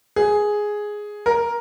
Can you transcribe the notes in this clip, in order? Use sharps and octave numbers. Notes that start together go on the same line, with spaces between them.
G#4
A#4